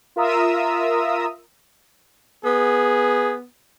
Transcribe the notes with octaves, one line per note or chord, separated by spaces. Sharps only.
F4 A#4 E5 A#5 D#6 E6
B3 G#4